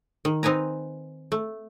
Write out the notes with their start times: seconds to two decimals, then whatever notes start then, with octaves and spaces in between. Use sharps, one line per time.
0.25 D#3
0.43 C4 D#4 B4 G#5 A#5
1.32 A3